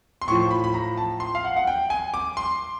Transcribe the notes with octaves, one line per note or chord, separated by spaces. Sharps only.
C6
A2 F3 C#6
B5
B5
A#5
A5
C6
F5
F#5
F#5
G5
G#5
D6
C6